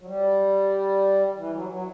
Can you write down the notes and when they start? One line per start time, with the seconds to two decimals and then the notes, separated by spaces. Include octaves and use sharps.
0.01 F#3
0.05 G3
1.36 E3
1.53 F#3
1.69 F#3